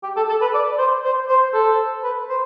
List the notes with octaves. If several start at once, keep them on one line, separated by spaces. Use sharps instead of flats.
G4
A4
A4
B4
D5
C5
C5
C5
A4
B4
C5